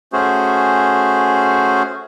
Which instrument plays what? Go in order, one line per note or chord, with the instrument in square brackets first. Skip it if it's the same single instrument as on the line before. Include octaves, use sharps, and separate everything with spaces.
[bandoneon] A3 C#4 F#4 G#4 C5